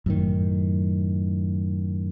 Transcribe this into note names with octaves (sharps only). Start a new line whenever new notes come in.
F#2 A2 D#3